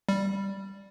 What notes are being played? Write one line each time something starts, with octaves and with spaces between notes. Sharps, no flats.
G3